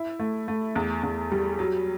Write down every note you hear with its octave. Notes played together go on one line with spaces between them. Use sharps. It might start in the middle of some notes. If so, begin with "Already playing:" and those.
Already playing: E4
A3
A3
E2
E2
G3
F#3